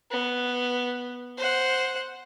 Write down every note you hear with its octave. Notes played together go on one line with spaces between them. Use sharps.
B3
C5 F#5